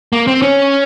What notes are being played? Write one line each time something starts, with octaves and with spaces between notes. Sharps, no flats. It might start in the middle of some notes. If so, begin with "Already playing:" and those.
A#3
C4
C#4